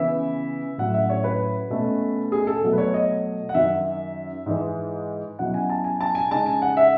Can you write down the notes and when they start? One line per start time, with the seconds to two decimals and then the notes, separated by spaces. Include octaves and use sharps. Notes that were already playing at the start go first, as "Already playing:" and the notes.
Already playing: C#3 E3 B3 E4 E5
0.78 A2 F#3 C#4 E4 F#5
0.94 E5
1.10 C#5
1.24 B4
1.70 B2 A3 C#4
2.32 G#4
2.47 A4
2.63 B2 F#3 A3
2.73 B4
2.78 C#5
2.94 D#5
3.49 F#5
3.54 F#2 D#3 F#3 E5
4.46 G#2 E3 G#3
5.39 B2 F#3 C#4 E4 F#5
5.54 G#5
5.69 A5
5.84 G#5
6.00 A5
6.15 G#5
6.31 C#3 G#3 D#4 A5
6.46 G#5
6.62 F#5
6.77 E5